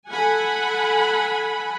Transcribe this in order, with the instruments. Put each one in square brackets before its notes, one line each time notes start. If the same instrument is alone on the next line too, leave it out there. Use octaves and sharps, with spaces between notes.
[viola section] A4 F#5 G#5 B5